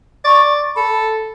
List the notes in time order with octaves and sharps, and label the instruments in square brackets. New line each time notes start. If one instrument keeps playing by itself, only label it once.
[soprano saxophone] D5 [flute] C#6
[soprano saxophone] A4 [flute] B5